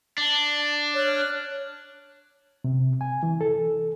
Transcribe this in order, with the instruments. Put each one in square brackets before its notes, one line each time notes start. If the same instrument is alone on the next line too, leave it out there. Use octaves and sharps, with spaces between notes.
[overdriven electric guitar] D4 [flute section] A5
[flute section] C#5 F6 F#6
[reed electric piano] C3
G#5
E3
A4